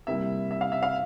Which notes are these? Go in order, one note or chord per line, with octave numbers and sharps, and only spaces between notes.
C3 G3 A#3 E4 E5
E5
F5
E5
F5